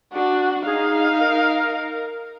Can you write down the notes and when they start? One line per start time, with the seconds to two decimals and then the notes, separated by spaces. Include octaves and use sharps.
0.14 D4 F#4
0.66 D#4 G#4 F5
1.20 A#4